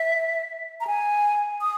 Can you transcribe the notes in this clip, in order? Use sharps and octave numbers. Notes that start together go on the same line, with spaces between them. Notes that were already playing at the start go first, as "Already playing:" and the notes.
Already playing: E5
A#5
G#5
D#6